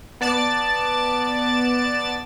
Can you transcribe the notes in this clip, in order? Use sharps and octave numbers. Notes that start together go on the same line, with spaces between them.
B3 D5 A5 A6